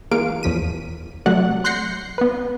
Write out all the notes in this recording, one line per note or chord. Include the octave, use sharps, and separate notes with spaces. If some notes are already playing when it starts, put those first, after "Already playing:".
E3 G#3 A#3 F5 D7
E2 F3 B6 D#7
C3 F#3 A3 D5 F#5 F#6
C6 F#6 G6 A#6 C7 C#7
B3 B4